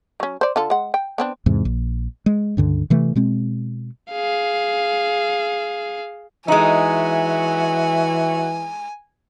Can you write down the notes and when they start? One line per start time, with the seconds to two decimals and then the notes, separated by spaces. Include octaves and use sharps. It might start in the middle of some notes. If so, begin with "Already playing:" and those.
0.20 F#3 C#4
0.41 C5 D5
0.56 D3 F4 A4
0.70 G#3 F#5
0.94 G5
1.18 B3 C4 D4
1.46 E2 G#2 C3
1.65 A#1
2.26 G#3
2.57 C#2 G2 D3
2.90 C3 E3 A3
3.15 B2 G#3 C4
4.12 G#4 F5
6.48 E3 G#3 D#4 F#4 C#5 E5 G#5